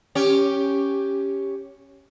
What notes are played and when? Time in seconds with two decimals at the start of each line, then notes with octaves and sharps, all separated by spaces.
0.15 C#4 G4